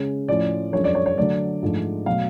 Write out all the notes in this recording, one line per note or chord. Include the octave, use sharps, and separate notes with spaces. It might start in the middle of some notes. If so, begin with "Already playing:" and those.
Already playing: C#3 G#3 C#4
A2 F3 A3 C#4 D5
F#2 F3 G#3 D4 C#5
D5
C#5
C#5
D3 F#3 A3 D4 D5
G#2 F3 A3 D4
B2 F#3 A3 F5